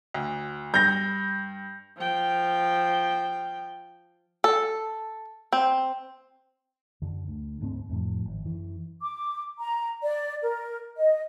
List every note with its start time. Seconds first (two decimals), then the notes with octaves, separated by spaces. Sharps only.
0.14 D2
0.74 G2 G6 A#6
1.98 F3 G5
4.44 A4
5.52 C4
7.02 F#2 D3
7.28 D2
7.61 D2 G#2 A#3 C4
7.89 F2 A2 F3
8.25 G#1
8.44 F#2 E3
9.01 D6
9.60 A#5
10.03 D5
10.42 A#4
10.97 D#5